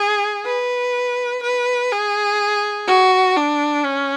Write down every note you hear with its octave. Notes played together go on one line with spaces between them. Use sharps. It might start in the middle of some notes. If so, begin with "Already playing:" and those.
Already playing: G#4
B4
B4
G#4
F#4
D4
C#4